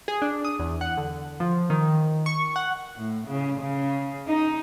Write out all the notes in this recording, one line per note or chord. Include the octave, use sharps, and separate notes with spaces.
G#4
D4
D#6
E2
F#5
D3
F3
D#3
C#6
F#5
A2
C#3
C#3
D#4